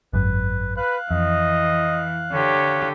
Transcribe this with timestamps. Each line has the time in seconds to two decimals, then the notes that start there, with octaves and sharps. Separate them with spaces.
0.13 G#1 F#2 B4
0.77 B4 F5 F#6
1.11 F2 E3 D#5
2.32 D3 G4 C#5